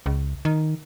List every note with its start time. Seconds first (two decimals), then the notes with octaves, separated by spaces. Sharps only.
0.06 C#2
0.45 D#3